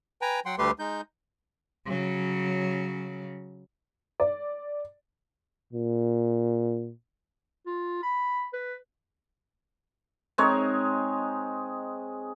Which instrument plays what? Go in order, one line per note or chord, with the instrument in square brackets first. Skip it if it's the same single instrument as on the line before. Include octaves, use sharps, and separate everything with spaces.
[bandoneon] B4 G5 G#5 A#5
F#3 F#5 G5 C6
D2 G3 A3 G4 B4 C6
G#3 D#4 G6
[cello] C#3 F#3
[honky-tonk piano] D5
[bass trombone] A#2
[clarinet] F4
B5
B4
[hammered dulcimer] G#3 C4 D#4 C#5